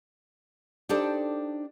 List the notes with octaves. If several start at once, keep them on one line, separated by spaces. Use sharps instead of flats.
D4 D#4 G4 A4 C5 D5